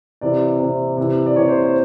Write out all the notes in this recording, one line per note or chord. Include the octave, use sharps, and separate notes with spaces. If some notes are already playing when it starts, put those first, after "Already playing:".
C3 E3 D5
C3 E3
C3 E3
D5
C3 E3 C#5
C5
C5